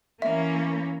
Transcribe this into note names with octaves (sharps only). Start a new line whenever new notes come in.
E3 A#3 C#4 E5